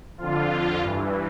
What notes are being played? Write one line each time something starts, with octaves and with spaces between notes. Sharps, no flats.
F2 D3 F4
G2 E3